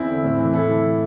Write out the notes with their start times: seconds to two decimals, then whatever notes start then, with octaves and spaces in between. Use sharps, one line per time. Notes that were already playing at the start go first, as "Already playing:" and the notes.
Already playing: E2 C4 E4
0.09 D3
0.24 A2
0.39 E3
0.54 A2 E4 A4
0.69 E3